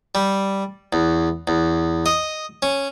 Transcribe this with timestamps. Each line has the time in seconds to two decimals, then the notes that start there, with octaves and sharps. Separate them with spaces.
0.15 G3
0.93 E2
1.48 E2
2.06 D#5
2.62 C#4